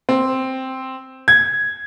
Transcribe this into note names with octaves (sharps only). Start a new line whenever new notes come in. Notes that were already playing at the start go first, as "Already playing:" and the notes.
C4
G#6